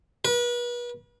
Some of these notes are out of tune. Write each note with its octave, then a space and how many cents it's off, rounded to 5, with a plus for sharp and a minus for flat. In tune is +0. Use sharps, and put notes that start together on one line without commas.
B4 -40